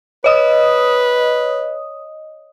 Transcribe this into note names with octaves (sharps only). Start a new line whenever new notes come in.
B4 C#5 D#5 D#6